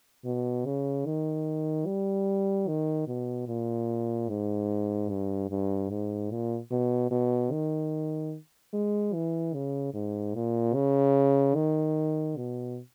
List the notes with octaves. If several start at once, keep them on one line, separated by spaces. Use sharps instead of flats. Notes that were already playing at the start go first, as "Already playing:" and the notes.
B2
C#3
D#3
G3
D#3
B2
A#2
G#2
G2
G2
G#2
A#2
B2
B2
D#3
G#3
E3
C#3
G#2
A#2
C#3
D#3
B2